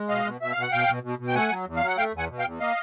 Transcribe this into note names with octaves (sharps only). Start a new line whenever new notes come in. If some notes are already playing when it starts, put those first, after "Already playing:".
Already playing: G#3
B2 D#5 F5
B2
B2 E5
B2 F5
F#5
B2 F5 G5
B2
B2
B2
G5
A3 F#5 G#5
F#3
E2
F#3 F5
F#5
A3 F5 G5
E2
F#5 G#5
B2
F5 G5
E2
A#3 D#5 F5